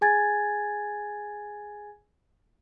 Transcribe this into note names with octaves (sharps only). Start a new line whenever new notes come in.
G#4 G#5 G#6 A6